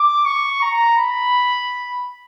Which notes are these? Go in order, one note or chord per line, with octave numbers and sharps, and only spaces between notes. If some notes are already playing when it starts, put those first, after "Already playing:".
Already playing: D6
C#6
A#5
B5